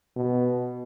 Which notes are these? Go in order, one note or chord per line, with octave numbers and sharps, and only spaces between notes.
B2